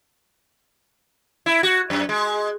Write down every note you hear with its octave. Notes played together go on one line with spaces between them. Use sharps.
E4
F#4
F#2
G#3